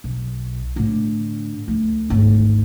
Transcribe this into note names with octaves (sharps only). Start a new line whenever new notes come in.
B1
A2 D3
D2
G#1 D2